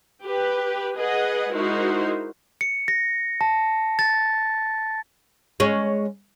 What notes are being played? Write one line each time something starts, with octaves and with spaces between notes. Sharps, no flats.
G4 B4
G#4 B4 D#5 F#5
G#3 D#4 E4 F#4 A#4 C5
C#7
A#6
A5
A6
G#3 C#4